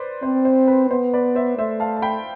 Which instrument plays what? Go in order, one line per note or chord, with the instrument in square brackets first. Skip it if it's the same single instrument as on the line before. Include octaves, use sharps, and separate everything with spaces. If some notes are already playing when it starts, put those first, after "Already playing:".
Already playing: [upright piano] B4 C5 D5
[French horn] C4 [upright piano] C5
[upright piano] C5
B4
[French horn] B3 [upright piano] C5
[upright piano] B4 D5
C5 E5
[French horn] A3 [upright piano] C5 E5
[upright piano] F5 A5
A5
G5 B5